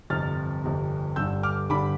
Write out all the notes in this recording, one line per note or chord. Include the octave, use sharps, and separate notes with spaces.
G1 F2 C3 F6 A6
G1 F2 C3
G1 G2 D3 E6 G6
D6 F6
G1 G2 D3 B5 D6